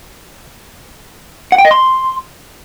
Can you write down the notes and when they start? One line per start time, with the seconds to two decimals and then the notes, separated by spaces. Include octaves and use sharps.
1.52 F#5
1.58 G5
1.65 D#5
1.71 C6